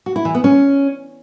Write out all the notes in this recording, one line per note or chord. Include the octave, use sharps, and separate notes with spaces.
F#4
E4
E3
B3
C#4